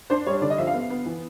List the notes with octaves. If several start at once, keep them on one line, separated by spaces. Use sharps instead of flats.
D4 C5
G3 C#5
D3 D5
D#5
F3 E5
F5
B3
B3
E3